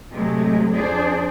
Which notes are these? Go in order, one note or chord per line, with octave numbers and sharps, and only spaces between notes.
A2 C3 F#3 G#3 A3
F2 D4 G#4 C5 D5